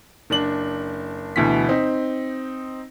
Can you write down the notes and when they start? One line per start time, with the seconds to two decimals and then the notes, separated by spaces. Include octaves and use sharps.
0.30 F#1 D4 F#7
1.36 D2 B2 E3 B6
1.69 C4 D#4